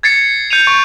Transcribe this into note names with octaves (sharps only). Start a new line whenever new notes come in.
G#6 A6 C7 C#7
G6 C#7 D#7 F7
C#6